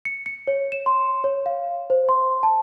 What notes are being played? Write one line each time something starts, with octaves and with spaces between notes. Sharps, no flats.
C#7
C#7
C#5
E7
C6
C#5
F5
C5
C6
A5